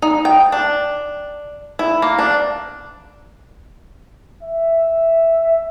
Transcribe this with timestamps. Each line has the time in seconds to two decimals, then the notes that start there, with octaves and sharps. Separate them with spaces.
0.02 D#4
0.25 G5
0.52 D4
1.79 E4
2.02 A#3
2.19 D4
4.43 E5